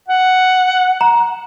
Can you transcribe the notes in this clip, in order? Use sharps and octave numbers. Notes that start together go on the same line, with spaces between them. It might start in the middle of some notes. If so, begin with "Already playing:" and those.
F#5
A#5